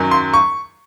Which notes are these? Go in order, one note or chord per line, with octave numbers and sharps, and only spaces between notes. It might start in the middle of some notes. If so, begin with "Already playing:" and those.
Already playing: F#2 D#3 F#3
C6
C#6